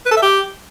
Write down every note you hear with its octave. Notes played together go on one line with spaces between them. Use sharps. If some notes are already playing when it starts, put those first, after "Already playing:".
B4
A4
E5
G4